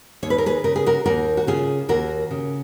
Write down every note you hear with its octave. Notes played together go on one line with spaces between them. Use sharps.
D#2 C#5
B4
A#4
G#4 B4
C#3 A#4
G#4
F#4 A#4
D#2 F#4 A#4
F#4
C#3 F4 G#4
D#2 F#4 A#4
C#3